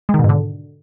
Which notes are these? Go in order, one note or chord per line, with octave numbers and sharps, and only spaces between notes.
G#3
D#3
B2
G#2
D3